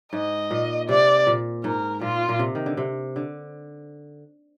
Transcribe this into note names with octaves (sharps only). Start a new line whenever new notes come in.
G#2 D#5
A#2
C3 D5
A#2
G#2 A#4
A#2 F4
A#2
C3
D#3
D3
C3
D3